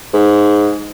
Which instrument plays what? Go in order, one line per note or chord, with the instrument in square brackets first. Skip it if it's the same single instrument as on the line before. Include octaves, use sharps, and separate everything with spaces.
[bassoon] G#2